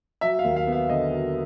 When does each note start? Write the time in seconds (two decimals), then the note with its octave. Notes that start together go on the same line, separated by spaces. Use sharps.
0.21 F#3 E5
0.39 F5
0.44 D#2
0.56 F5
0.67 B3
0.72 F5
0.90 D3 D#5
1.12 F#3